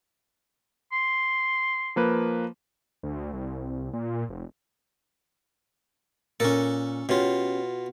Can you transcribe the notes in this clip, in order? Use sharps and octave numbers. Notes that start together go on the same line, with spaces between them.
C6
F3 A#3 B4
D2
C2
A#2
F1
A#2 C#4 A4 A#4
B2 C#4 F4 G4